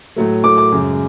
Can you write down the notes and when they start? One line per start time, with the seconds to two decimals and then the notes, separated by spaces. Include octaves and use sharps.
0.16 A2 F#3 A3
0.44 A2 F#3 A3 D6
0.58 D6
0.72 F#2 C#3 G#3